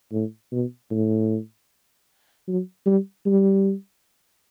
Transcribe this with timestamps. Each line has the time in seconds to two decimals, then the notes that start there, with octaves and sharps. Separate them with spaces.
0.12 A2
0.52 B2
0.91 A2
2.48 F#3
2.86 G3
3.26 G3